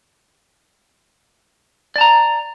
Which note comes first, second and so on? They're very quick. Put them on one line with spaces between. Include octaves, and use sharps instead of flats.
D5 A5 A#5